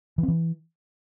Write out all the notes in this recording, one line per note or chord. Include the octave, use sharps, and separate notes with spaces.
E3
C4
E3